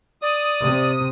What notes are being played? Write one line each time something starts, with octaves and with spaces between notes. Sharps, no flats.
D5 D#6
C3